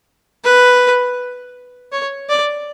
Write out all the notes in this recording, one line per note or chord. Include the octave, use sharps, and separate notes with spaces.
B4
C#5
D5